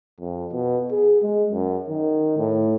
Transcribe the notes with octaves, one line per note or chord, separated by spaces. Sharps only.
F2
B2
G#4
G#3
F#2
D#3
A2